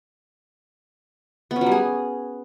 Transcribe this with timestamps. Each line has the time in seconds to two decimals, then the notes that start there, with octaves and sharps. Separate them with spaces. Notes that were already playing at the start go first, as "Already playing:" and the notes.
1.51 B3
1.56 C#4
1.61 F#3
1.66 G3
1.72 G#4